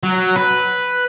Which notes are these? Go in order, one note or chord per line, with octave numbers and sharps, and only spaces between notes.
F#3
B4